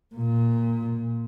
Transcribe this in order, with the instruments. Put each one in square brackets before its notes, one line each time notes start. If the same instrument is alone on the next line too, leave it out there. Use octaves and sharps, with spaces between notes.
[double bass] A#2